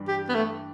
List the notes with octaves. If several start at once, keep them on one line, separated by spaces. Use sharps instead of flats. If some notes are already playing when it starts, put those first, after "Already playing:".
Already playing: G2 E3 G3 D4
G4
B3
A3